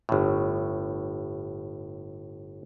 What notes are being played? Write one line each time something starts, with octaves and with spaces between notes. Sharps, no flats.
G1 A2